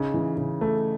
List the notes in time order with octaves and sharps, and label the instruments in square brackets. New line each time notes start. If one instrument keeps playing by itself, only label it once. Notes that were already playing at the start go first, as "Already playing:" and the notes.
Already playing: [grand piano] C#3 D#4
E3
C#3
A3